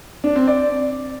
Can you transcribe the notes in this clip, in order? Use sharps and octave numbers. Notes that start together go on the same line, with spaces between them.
D4
C4
D5